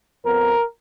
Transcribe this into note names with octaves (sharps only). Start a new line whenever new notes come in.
F2 F3 B3 A#4